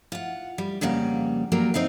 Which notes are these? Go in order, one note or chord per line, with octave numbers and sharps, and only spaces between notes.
F4 F#5
G3
F2 C#3 G3 A#3 F#5
F#3 G3 A#3 A#4
C4 D#4 A#4 F5